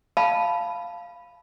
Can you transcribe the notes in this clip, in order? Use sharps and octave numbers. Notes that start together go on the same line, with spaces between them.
F5 A5 B5